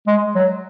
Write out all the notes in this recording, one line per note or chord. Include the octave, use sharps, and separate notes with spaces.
G#3
F#3